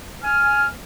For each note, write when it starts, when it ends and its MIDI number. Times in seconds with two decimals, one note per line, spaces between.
0.23 0.66 80
0.23 0.66 89